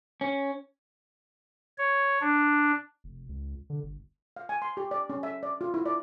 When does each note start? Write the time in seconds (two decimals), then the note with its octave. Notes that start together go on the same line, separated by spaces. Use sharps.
0.21 C#4
1.78 C#5
2.21 D4
3.04 F1
3.29 C#2
3.70 D3
3.83 G1
4.36 F5
4.49 G#5
4.62 C6
4.77 G4
4.91 D5
5.10 C#4
5.23 E5
5.43 D5
5.61 F4
5.74 E4
5.86 D5